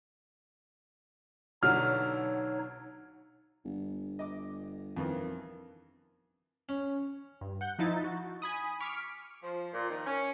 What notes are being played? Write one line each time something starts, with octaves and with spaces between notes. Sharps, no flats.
B1 D3 F#3 D#4 C#5 F6
G1
D#5 D6
F2 D#3 E3
C#4
G2
F#5 G6
F3 D#4 E4 A6
F#4
G#5 B5 D#6
C#6 D6 F6 B6 D7
F3
A#2
D#3
C#4